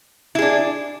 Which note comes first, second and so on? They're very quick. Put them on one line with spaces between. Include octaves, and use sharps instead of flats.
E4 G#4 D4